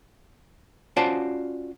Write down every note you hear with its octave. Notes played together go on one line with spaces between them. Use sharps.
C#4 F4 F#4 C5 D5 A5